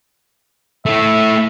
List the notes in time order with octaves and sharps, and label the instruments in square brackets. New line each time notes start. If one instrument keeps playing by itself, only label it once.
[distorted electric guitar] A3 E4 [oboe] E5